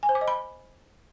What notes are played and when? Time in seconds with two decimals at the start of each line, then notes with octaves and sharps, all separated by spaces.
0.03 G#5
0.09 C5
0.15 D6
0.21 D#5
0.28 B5